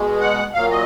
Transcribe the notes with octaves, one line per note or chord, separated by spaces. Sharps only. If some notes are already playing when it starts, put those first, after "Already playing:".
Already playing: B2 G#3
F#5
A#2 F#3 F5
D#5